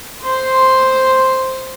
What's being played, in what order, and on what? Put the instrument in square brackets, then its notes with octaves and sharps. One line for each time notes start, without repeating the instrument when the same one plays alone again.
[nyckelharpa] C5 C6